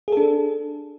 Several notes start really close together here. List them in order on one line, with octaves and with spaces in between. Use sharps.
G#4 A4 D4